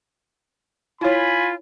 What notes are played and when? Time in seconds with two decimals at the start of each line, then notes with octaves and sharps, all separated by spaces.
1.01 E4 F4 C#5 G#5 B5